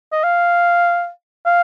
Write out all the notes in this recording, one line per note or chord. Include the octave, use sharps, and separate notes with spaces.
D#5
F5
F5